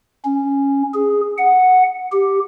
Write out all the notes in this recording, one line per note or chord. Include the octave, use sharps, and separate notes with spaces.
C#4
G#4
F#5
G4